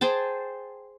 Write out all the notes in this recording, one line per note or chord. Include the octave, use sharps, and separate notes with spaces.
G#4 C5 G5 A5